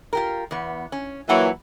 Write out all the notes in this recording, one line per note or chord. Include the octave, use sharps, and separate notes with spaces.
F4 G4 A#4
E2 B3
C#4
A#2 E3 F#3 E4 F#5 A#5